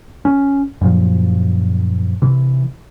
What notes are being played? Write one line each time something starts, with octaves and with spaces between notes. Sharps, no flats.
C#4
F#2 A#2 F3
C3 E3